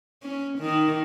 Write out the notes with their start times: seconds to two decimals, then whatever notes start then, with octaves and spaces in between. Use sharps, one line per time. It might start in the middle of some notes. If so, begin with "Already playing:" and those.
0.23 C#4
0.59 D#3